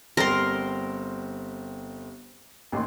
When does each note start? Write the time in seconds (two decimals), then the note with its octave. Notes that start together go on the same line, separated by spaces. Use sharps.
0.17 G1 G3 C4 A#4 C6
2.72 A1 D#2 C6